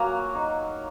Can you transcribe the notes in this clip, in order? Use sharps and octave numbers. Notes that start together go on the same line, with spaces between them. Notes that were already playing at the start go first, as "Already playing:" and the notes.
Already playing: F#3 A#3 G#5 A#5
D#4